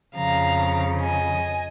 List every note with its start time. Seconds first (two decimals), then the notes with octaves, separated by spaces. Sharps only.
0.16 F2 C#3 F3 F5 A#5
1.00 D#5 G#5